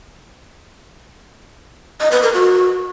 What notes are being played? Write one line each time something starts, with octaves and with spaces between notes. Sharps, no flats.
D#5
B4
A#4
F#4